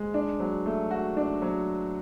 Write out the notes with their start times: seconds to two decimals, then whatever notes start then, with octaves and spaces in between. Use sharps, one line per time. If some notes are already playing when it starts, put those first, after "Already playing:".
Already playing: G#3
0.14 D4
0.40 F#3
0.66 A3
0.91 F#4
1.17 D4
1.42 F#3